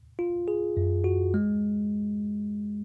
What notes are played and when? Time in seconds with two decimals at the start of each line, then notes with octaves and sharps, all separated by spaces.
0.19 F4
0.48 G#4
0.77 F#2
1.04 F#4
1.34 G#3